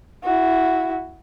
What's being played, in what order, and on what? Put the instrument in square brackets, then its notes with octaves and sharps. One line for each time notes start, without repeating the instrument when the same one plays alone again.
[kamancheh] E4 F#4